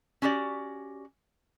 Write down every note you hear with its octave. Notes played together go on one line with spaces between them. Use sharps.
C#4 F#4 G4 D5